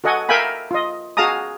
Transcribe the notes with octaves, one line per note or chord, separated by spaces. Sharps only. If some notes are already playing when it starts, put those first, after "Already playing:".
F#4 A4 D#5 F#5 G#5
A#4 E5 F5 G5 G#5 B5
F4 D#5
F#4 G#4 F5 A5 A#5 D#6